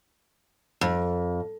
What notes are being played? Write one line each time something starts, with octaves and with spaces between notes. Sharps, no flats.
F2